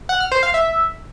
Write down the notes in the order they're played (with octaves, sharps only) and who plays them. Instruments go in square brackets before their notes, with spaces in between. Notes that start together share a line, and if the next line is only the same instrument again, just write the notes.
[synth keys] F#5
F6
C5
F5
E5